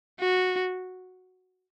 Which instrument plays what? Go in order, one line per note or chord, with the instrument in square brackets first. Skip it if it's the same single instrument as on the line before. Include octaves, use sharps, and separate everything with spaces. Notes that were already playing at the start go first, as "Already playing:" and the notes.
[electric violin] F#4